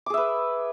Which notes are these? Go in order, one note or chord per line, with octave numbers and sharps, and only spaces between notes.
G#4 B4 E5 D6